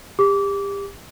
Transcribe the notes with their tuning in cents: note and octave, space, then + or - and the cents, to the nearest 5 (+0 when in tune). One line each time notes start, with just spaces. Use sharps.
G4 +30 D6 -25